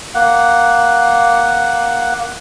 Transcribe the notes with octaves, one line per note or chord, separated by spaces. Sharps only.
A#3 F#5